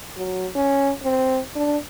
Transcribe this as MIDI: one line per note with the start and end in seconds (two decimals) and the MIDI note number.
0.17 0.47 54
0.55 0.91 61
1.03 1.40 60
1.56 1.77 62